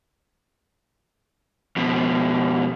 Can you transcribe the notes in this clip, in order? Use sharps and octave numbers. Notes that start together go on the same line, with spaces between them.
F2 B2